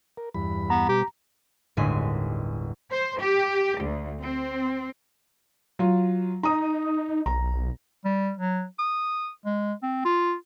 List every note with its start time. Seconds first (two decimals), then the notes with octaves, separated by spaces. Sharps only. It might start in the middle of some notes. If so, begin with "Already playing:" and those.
0.17 A#4
0.34 E2 G2 B5
0.70 B3 A#5
0.89 B2 G3 G4
1.77 G1 D#2 A2 G#3 G#5 B6
2.92 C5
3.21 G4
3.83 D2
4.20 C4
5.79 F#3 F4
6.43 D#4 A#5 D#6
7.26 B1 A#5
8.05 G3
8.37 F#3
8.79 D#6
9.45 G#3
9.83 C4
10.05 F4